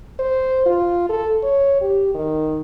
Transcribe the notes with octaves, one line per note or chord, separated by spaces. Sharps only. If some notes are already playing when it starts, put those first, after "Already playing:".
C5
F4
A4
C#5
G4
D#3